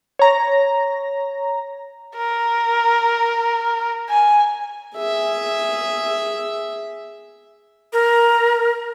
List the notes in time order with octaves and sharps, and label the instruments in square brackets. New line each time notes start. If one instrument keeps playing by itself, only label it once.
[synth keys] C#5 A#5 A#6
[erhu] A#4
G#5
[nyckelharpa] G#4 E5
[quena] A#4